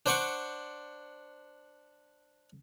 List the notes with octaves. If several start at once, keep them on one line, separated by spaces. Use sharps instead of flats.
D4 C5 D5 F#5 C#6 D6